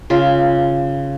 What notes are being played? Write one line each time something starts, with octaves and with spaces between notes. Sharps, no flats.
C#3 F4